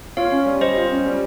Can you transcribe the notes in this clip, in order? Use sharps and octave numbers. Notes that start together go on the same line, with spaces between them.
F4 C#5 F5
C#4
G3
G3 C5 D#5
F4
C#4
G3